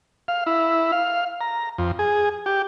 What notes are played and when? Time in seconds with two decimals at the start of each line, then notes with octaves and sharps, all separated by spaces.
0.28 F5
0.46 E4
0.92 F5
1.41 A#5
1.78 F2
1.99 G#4
2.46 G4